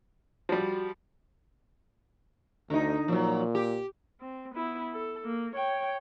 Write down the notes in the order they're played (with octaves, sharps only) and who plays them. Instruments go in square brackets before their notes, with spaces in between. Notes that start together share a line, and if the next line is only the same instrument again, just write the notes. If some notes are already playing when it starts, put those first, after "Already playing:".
[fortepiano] F3 G3 [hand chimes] F#4
[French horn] D2 [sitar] D3 D#4
[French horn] A#2 [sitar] F3 F#3
[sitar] G4
[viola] C4
B3 E4
A4
A#3
C#5 G5